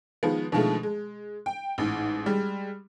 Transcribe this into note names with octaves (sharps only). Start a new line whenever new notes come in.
D#3 F3 G#3 B3
B2 D3 D#3 F3 G#3 A3
G#3
G5
A1 G#2
G3 G#3